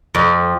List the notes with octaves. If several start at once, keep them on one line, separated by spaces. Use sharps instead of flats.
F2